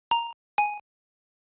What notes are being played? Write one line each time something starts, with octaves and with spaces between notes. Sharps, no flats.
A#5
G#5